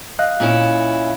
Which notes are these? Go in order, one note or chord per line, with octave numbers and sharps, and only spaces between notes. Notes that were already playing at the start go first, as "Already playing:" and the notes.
D#5 F5 F#6
A#2 C#4 E4